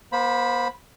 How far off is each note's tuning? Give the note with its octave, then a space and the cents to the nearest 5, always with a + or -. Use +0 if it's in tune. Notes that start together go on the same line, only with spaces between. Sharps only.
A#3 +45 C5 +0 B5 -5